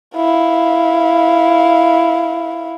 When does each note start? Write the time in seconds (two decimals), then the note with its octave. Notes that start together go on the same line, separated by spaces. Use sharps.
0.16 E4 F5